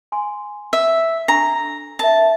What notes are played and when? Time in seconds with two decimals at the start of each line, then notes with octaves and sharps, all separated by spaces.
0.12 G#5 C6
0.73 E5
1.28 D4 A4 A#5 C#6
1.99 A#4 E5 A5